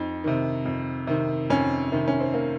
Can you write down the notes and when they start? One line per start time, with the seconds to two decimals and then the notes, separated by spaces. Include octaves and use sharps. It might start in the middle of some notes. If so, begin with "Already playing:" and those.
Already playing: F2 D#4
0.24 C3 D#3
0.65 F2
1.07 C3 D#3
1.50 F2 C#4
1.92 C3 D#3
2.08 C#4
2.20 C4
2.34 A#3